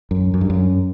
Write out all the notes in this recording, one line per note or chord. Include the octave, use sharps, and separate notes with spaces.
F#2
F#2
G2
F#2